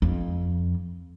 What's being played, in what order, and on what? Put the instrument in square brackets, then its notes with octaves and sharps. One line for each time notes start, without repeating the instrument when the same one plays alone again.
[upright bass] F2